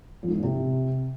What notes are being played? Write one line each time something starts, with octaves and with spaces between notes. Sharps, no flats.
F2
G#2
E3
A#2
C3